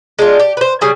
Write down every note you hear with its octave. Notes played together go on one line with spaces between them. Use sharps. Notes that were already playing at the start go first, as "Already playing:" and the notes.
G#3 D4 F4
G4
B4 C5
C#3 G3 G#4 G#5